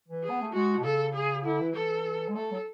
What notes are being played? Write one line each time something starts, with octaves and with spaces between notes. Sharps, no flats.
E3
G#4
B3
A3
G#3 F#4
B2
C#3 A4
G#4
D3 E4
E3
E3 A4
G#3
A3 A4
F#3